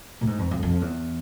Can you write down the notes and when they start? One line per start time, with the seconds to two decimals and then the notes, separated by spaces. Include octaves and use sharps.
0.21 A2
0.27 G#2
0.39 F2
0.51 F2
0.63 F2
0.81 E2